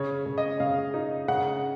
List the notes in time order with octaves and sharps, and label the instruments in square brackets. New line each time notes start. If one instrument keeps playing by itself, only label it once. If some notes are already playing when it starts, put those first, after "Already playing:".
Already playing: [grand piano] C#3 [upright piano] C#5
[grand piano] C#3
[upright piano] D#5
[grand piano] C#3 [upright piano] F5
[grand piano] D#4
[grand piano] C#3 [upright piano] F#5